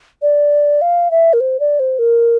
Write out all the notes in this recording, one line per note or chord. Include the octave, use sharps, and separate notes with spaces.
D5
F5
E5
A#4
C5
D5
C5
A#4